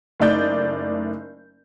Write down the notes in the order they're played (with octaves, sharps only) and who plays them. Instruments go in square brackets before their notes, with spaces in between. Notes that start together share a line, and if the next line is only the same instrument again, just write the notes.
[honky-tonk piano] F#1 A3 D#4 D5 G6